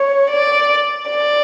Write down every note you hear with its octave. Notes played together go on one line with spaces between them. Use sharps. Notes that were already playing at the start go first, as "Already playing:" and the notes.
Already playing: C#5
D5
D5